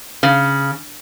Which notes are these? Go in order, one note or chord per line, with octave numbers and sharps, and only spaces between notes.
C#3